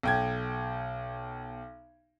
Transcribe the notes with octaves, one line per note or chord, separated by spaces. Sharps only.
B1 G5 G#6